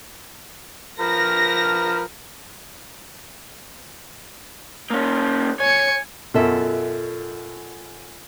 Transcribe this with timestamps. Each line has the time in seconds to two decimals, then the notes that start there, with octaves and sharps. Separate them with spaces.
1.00 F3 A#4 B4 A#6
4.90 A#3 C#4
5.60 C#5 G#5 C#7
6.34 F#2 B2 F4 A4 E5